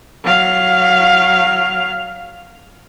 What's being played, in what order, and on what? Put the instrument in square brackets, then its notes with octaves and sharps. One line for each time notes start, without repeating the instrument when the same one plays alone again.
[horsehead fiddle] F#3 F5